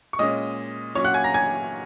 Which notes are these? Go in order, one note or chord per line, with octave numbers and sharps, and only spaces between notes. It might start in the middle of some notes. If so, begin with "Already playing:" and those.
C#6
A#2 G#3 C#4 D#5 D#6
A#2 F#3 C#4 C#5 C#6
F#5 F#6
G#5 G#6
A#5 A#6
G#5 G#6